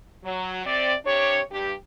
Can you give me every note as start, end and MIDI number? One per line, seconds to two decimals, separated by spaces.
0.25 0.62 54
0.65 0.93 48
0.65 0.93 60
0.65 0.93 74
1.05 1.40 48
1.05 1.40 62
1.05 1.40 67
1.05 1.40 73
1.51 1.73 43
1.51 1.73 67